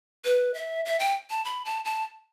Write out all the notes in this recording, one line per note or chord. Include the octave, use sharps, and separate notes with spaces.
B4
E5
E5
G5
A5
B5
A5
A5